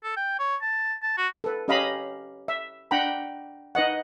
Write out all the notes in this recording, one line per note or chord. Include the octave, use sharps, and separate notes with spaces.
A4
G5
C#5
A5
A5
F#4
A4 B4
C#4 G4 D#5 F5 A#5 B5
E5
D4 F#5 G5 A#5 B5
D#4 B4 D#5 F#5